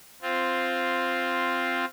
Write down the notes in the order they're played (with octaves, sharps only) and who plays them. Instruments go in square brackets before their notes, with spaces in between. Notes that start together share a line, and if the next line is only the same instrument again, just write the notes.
[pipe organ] C4 F4